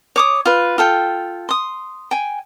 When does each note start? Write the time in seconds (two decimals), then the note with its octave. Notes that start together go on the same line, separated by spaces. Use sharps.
0.16 C#5 D6 D#6
0.46 F4 B4
0.78 F4 A4 G5
1.49 C6 D#6
2.11 G5 G#5